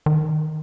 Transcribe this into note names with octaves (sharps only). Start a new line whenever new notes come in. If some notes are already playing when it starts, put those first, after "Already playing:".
D#3